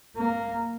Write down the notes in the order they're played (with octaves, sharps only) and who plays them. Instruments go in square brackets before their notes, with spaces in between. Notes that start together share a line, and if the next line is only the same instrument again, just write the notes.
[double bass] A#3